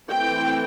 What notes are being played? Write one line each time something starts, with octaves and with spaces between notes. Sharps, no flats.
E3 A3 C4 G5